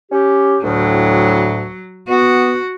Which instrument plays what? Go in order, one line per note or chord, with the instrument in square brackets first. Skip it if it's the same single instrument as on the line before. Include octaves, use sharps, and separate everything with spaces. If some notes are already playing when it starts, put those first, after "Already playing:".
[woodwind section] C#4 G4
[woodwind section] D2 A2 [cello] F#3
[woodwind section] B3 [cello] F#4